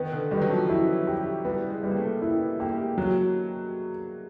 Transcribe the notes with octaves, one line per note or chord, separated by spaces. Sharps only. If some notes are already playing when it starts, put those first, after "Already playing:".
Already playing: D#3 B3
D3
D#3 G3
F#3
F3
F#3 E4
G4
G3 B3
G#3
G3
A#3
A3
B3 E4
A#3 G4
G#3
F#3